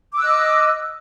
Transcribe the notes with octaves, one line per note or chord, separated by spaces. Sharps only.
D#5 D6 E6 F#6